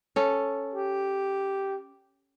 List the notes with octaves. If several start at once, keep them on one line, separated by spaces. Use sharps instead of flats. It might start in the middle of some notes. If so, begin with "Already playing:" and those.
C#4 A4
G4